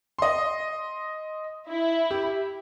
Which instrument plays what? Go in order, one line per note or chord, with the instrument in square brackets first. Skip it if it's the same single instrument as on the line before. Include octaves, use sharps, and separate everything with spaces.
[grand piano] D#5 C6
[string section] E4
[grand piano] G4